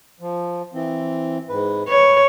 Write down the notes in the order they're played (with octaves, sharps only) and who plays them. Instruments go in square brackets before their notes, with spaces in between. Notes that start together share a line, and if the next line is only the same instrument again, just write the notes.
[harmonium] F3
E3 C4
G#2 B4
[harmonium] B4 [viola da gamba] C#5